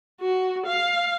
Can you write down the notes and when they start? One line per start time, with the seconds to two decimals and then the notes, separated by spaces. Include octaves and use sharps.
0.21 F#4
0.66 F5